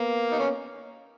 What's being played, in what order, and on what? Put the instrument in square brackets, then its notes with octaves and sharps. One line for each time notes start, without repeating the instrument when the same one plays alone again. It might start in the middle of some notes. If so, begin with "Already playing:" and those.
Already playing: [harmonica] A#3 [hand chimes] B3 B4
[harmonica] D#4
C#4